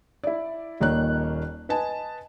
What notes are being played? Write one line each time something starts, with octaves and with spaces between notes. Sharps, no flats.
E4 D5
D#1 D#3 A#3 C#5 D5 F#6
B4 D#5 G#5 A5